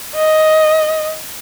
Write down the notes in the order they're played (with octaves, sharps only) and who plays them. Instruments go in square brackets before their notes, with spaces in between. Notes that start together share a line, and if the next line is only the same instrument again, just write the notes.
[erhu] D#5